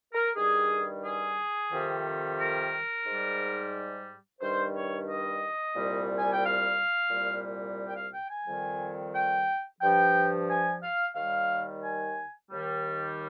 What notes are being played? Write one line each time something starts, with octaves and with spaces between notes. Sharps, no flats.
A#4
G2 D#3 G3 G#4
G#4
F2 C3 D#3 G3
A#4
G#2
G3
G2 D#3 G3 C5
C#5
D#5
C2 A#2 G3
G#5
G5
F5
C2 A#2 G3
G5
F5
G5
G#5
F2 D#3 G3
G5
G2 F3 G5
G#5
F5
D#2 D#3 G3 F5
G#5
D#2 D#3 G3